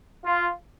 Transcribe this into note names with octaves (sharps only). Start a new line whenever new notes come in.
F4